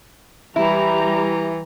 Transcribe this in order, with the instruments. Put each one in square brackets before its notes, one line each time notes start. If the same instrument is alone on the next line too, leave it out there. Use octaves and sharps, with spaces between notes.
[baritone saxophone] E3 [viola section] G3 G4 A#5 [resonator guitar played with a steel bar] E4